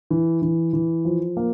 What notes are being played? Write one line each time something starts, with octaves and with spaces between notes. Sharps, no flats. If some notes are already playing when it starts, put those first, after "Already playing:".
E3
E3
E3
F3
A#3